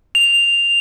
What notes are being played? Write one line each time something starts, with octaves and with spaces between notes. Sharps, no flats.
F7